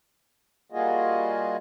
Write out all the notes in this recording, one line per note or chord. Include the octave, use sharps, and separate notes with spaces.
G3 A#3 F4 F#4 G#4 D#5